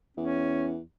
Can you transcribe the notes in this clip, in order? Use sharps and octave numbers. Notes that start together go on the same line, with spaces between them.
E2 C#4